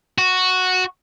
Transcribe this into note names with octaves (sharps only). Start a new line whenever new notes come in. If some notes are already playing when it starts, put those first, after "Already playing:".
F#4